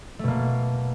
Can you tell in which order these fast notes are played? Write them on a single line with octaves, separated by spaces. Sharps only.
A3 B2 A#3